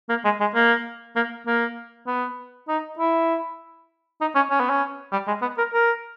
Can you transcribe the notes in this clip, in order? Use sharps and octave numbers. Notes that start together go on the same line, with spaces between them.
A#3
G#3
G#3
A#3
A#3
A#3
B3
D#4
E4
D#4
C#4
C#4
B3
C#4
G3
G#3
B3
A#4
A#4